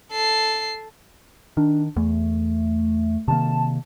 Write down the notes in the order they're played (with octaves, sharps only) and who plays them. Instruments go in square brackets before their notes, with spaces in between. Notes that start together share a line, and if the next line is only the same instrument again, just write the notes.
[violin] A4 C7
[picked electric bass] D#3 [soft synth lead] D4
[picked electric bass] E2 [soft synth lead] A3
[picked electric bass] C3 D#3 A#3 [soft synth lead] A5